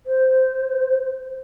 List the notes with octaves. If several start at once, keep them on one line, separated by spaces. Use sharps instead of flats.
C5